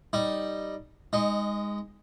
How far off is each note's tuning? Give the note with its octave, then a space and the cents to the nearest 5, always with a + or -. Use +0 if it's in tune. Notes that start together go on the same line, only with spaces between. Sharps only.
G3 +0 D#4 -5
G#3 -20 D#4 +5